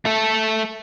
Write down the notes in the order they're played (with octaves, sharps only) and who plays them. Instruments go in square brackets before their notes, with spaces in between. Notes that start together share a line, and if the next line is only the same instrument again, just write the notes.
[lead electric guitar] A3 A4